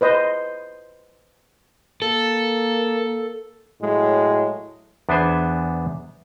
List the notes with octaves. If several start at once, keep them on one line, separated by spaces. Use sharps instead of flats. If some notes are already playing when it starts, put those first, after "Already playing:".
B4 C5 D#5
A#3 A4
A2 F#3 G#3
E2 B3 D4 B4 C5 G#5